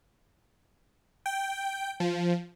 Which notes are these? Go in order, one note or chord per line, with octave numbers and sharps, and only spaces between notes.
G5
F3